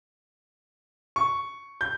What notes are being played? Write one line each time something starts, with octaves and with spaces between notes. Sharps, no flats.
C#6
G6